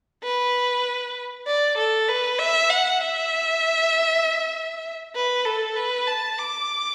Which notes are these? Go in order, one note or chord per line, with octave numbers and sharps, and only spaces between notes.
B4
D5
A4
B4
E5
F#5
E5
B4
A4
B4
A5
D6